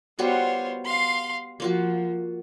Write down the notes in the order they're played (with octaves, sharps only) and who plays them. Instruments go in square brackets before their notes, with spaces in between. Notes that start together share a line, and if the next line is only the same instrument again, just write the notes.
[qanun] G3 B3 F#4 [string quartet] F4 C5 C#5
[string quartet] F5 C6
[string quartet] F3 [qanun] A#3 F4 F#4